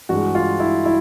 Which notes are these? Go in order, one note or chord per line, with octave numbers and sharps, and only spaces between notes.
G2 E3 G#3 F#4
F4
E4
E4